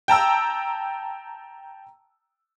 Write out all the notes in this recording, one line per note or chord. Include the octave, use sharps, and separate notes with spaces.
G5 A5 A#5 E6